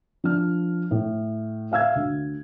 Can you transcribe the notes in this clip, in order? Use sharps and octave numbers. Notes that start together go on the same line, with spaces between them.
F3 D4 F6
A2
E5 F5 E6 G#6
D2